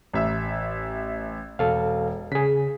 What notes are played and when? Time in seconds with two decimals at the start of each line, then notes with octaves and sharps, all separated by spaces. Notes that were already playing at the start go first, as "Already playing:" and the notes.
0.13 A1 E5 E6
1.59 E1 A4 F5
2.32 C#3 G#4 B6